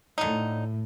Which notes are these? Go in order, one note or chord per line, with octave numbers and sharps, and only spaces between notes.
A2 D3 D#4